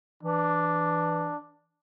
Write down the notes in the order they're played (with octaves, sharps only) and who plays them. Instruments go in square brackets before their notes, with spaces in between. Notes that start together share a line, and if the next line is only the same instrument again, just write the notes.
[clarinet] E3 [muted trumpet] D4